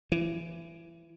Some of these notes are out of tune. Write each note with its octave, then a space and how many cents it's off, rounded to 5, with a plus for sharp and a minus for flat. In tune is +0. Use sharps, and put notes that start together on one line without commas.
E3 +25